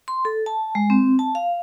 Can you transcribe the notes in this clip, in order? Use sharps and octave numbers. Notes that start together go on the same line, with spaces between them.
C6
A4
A5
G#3
C4
A5
F5